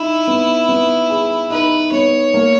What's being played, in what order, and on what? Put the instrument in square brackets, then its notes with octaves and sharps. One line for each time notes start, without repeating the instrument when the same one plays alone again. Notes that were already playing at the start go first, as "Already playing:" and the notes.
Already playing: [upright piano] D#4 [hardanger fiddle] E4
[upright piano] B3
B3
G#4
[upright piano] D#4 [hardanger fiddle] B4
[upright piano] B3 [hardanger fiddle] C#5
[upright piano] A#3